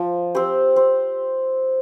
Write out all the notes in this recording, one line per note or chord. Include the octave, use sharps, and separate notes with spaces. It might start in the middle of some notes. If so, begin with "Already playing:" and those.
Already playing: F3
C4 G4 C5
C4